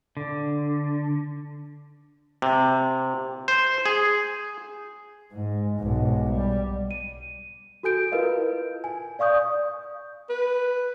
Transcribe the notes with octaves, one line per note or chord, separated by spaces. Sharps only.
D3
C3
C5
G#4
G#2
B1 G#2
G3
D#7
F#4 A4 G#5 G6 D7
E4 F4 A#4 B4 D#5 F5
G#5
D5 F5 C#6 D#6 G6
B4